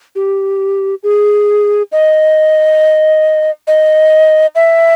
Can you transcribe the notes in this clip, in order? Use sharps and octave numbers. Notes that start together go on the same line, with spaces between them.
G4
G#4
D#5
D#5
E5